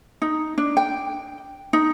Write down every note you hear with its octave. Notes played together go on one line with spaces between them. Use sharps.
D#4
D4
G5
D#4